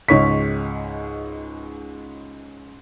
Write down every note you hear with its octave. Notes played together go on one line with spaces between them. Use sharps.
C#2 G#2 C#5 C#6 B6